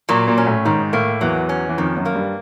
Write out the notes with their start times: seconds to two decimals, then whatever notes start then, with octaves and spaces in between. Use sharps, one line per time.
0.09 A#2 F#3 A#3
0.27 A#2 A#3
0.38 C#4
0.47 A2 A3
0.65 G#2 D#3 G#3
0.93 A2 A3 A#3
1.21 E2 E3 F#3
1.49 C#4
1.69 E3
1.78 F2 D#3 F3
1.97 F#2 F#3
2.06 A#3
2.15 G2 G3